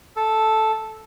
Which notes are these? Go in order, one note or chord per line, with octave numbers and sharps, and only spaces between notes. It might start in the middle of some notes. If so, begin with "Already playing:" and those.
A4